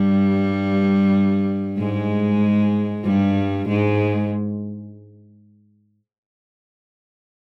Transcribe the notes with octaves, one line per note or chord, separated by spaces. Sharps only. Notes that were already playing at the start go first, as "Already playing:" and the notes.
Already playing: G2 G3
G#2 G#3
G2 G3
G#2 G#3